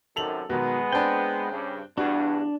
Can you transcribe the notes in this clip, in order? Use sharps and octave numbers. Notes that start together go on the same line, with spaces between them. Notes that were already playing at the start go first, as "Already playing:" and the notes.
F#2 C3 D#3 A4 F7 F#7
B2 D#3 F#3 G#3 B3
C4 D4 G5
G2 C#3
E2 G2 D4 F#4